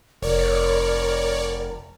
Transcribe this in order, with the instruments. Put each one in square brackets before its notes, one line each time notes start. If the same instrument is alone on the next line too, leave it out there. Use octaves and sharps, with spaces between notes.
[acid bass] F1 [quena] A#4 [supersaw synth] C#5 D5